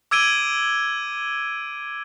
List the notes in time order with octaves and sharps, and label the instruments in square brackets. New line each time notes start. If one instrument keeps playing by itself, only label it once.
[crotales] D6 E6 G#6 D7 D#7 G7